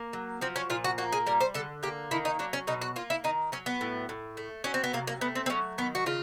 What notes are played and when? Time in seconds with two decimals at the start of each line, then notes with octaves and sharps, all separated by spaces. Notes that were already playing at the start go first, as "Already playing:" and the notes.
Already playing: A#3
0.13 F#3
0.41 F3 C4
0.56 C#4
0.70 A#2 F4
0.84 F#4
0.98 A#3 F#4
1.12 G#4
1.26 G3 A#4
1.41 C5
1.54 D3 A4
1.83 A#3 G4
2.11 D#3 E4
2.25 D#4
2.39 F#3 D4
2.53 C#4
2.67 B2 D#4
2.82 F#4
2.96 A#3 F4
3.10 E4
3.24 D#3 D#4
3.52 F#3 C#4
3.66 B3
3.81 A2
4.09 A2
4.37 A3
4.64 F#3 C#4
4.74 C4
4.84 B3
4.93 C3 A#3
5.07 A#3
5.21 A3 B3
5.35 C4
5.46 C4
5.50 F#3 C#4
5.78 D#3 B3
5.95 F#4
6.06 C#3 F4